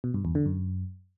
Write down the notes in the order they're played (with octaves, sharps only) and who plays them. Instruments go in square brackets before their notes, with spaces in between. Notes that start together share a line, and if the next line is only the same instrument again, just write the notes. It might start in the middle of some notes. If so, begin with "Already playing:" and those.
[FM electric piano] B2
G2
E2
D3
F#2